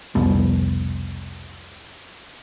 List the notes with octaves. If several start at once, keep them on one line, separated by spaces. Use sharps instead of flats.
F1 C2 B2